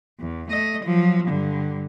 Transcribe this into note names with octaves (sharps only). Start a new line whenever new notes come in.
E2
A3 D#5
F3 F#3
G2 D3